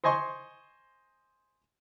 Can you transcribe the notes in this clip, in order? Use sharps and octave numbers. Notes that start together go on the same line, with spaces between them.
C5 D#5 G#5 C6 C#6